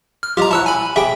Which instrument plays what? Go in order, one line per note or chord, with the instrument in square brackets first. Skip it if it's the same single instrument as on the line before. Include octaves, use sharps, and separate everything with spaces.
[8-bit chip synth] F6
[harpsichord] F4 D5 D#5 [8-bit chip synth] G4 A#5
[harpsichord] E4 C#5 F#5 [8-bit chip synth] A5 E6 F#6
[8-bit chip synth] G#5 B5
[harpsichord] C#3 G4 G#4 [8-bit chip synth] E5 G5